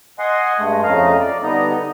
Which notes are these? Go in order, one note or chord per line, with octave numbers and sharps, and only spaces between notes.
D#5 F#5 G#5 C6 D#6
G2 G#3 A3
F2 C#3 A3 D#5 F5 A#5
D5
D3 G3 B3 D#4 D#5 A#5